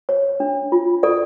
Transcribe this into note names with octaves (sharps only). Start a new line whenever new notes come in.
C#5
D4
F4
A4 D5